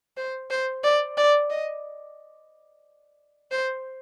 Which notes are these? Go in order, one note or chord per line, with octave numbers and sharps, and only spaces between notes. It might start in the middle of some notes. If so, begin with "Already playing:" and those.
C5
C5
D5
D5
D#5
C5